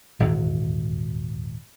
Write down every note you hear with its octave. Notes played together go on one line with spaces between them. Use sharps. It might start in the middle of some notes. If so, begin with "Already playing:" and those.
D#1 G#1 E2